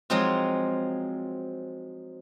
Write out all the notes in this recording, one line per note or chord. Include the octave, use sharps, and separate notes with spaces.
F3 F#3 G#3 C4 D#4 F4